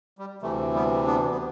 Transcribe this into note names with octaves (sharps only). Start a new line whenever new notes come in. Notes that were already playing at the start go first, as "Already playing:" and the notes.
G3
D2 C3 E3 A3
G3 B3
B3 D4
B3